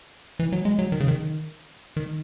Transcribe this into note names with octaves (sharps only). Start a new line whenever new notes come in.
E3
F#3
G#3
F#3
D#3
C#3
D#3
D#3